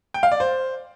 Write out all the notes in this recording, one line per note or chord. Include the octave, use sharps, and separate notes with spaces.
G5
F5
D5
C5